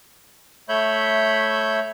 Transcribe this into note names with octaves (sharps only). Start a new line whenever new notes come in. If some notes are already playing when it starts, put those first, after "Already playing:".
A3 C#5 E5 B5 G6